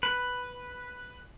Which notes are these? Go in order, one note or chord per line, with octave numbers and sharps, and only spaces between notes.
B4